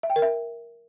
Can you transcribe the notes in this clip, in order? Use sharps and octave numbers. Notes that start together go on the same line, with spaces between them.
E5
G5
A#4
E5